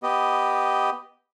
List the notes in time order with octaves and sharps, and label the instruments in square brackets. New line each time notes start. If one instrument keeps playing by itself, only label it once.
[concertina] B3 G4 D#5